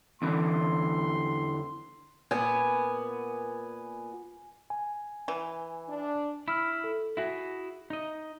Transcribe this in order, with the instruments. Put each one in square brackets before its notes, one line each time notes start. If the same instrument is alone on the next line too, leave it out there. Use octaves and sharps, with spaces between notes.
[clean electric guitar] E2 D3 E3 [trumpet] C6
[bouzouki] A#2 B3 [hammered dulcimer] G#5
[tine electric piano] G#5
[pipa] E3
[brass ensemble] D4
[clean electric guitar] E4 [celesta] B5 E6 F6
[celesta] A4
[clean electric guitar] E4 F#4 G#4 [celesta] E5
[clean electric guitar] D#4 D#5